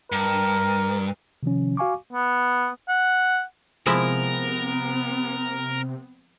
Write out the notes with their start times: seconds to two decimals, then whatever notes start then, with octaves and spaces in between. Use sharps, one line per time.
0.12 G2 A#4
1.43 C3 D#3 F3 C#4
1.77 F#4 F5 G#5 C#6 D6
2.13 B3
2.89 F#5
3.86 C3 F3 G#3 B3 C4 E4 A#4